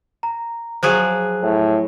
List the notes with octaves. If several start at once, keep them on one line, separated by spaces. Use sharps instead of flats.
A#5
F3 F#3 G#4 C5 F#6
A2